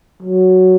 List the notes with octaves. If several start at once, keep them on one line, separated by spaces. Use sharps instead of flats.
F#3